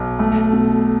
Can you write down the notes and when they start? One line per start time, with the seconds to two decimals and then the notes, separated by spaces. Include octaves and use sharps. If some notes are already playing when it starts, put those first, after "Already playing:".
Already playing: B1
0.19 A3
0.53 B2